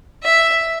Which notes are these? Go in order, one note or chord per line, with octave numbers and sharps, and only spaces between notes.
E5